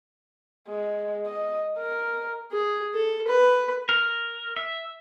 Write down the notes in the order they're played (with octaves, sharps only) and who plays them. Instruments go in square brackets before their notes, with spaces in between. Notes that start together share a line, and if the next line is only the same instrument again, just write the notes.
[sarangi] G#3
D#5
A#4
[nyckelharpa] G#4
A4
B4
[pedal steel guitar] A#4
E5